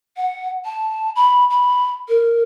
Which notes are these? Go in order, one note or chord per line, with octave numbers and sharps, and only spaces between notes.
F#5
A5
B5
B5
A#4